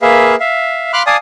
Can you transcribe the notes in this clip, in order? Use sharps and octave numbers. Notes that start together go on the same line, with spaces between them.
A#3 G#4 B4 E5 F5
E5 F5
F5 B5 C6 D6 F6 F#6
D5 F5 G#5 A5 D#6